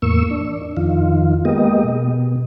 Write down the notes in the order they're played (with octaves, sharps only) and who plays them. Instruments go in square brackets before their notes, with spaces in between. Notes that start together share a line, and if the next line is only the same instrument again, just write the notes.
[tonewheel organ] E2 A2 A#3 C#6 E6
D4
F2 D#3 F4
G#3 A#3 B3 G4 D#5
B2